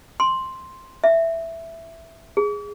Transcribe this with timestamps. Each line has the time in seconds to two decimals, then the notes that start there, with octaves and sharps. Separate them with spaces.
0.20 C6
1.04 E5
2.37 G#4